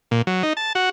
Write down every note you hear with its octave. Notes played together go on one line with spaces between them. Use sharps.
A#2
F#3
D#4
A5
F#4